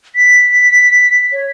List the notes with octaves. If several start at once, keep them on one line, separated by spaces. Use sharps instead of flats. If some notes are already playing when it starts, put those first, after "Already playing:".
B6
C#5